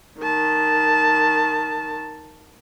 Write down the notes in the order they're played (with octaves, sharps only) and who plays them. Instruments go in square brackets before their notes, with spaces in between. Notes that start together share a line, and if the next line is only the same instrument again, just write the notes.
[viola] D#3 A5